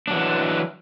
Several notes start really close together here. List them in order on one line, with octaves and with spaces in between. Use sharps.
D4 F#3 E3